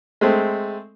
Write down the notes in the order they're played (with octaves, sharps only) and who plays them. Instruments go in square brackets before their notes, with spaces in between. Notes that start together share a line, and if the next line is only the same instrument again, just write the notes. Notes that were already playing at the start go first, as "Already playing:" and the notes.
[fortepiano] G#3 A3 C4